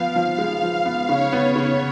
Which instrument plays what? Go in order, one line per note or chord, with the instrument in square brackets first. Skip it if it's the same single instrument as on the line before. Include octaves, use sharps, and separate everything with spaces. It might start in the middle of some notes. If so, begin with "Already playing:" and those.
Already playing: [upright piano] F3 B3 [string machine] F5
[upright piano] F3
G#3
F3
B3
[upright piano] C#3 [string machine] C#5
[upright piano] B3
[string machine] C#5
[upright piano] C#3